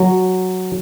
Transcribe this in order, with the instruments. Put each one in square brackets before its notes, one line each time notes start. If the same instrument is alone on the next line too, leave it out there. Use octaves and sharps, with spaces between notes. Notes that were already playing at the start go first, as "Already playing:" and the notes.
Already playing: [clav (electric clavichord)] F#3